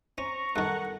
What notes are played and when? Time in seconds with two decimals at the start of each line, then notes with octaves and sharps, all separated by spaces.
0.18 C#4 C5 A#5 C#6
0.56 G2 D#3 A4 A#4 F#5 A5